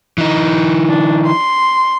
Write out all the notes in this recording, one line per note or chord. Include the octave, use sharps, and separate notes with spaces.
E3 D#4
D4
C6